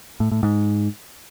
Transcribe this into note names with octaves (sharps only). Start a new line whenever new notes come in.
A2
A2
G#2